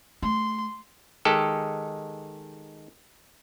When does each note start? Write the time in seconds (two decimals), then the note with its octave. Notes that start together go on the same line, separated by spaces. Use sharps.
0.23 A3 C6
1.25 D#3 G#3 G4 A4